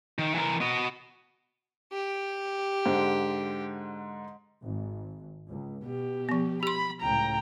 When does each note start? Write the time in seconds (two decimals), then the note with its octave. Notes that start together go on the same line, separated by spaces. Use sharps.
0.18 D#3
0.34 E3 A#4
0.61 F#4 D#5
1.92 G4
2.85 G#2 D3 C5
4.63 G#1
5.49 C#2
5.86 B2 G4
6.29 F3 B3
6.63 G4 B5 C6
7.01 C#2 A2 G5 A#5